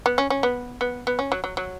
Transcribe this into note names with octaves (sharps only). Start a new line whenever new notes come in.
B3
C#4
C#4
B3
B3
B3
C#4
F#3
F#3
F#3